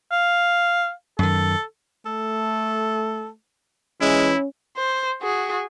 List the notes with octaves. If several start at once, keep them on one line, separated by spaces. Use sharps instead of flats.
F5
F#2 D#3 A4
A3 A4
E3 G#3 C#4 E4
C5
F#4 G#4